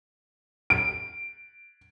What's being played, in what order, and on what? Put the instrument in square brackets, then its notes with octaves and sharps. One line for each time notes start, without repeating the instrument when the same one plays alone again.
[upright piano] D7